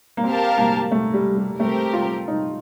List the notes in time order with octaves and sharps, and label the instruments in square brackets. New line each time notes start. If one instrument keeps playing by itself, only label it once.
[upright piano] A#3
[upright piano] C4 [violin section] G4 A#4 F5 A5
[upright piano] A#3
A3
G3
G3
[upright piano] A3 [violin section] C4 G4 A#4
[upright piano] F4
D#4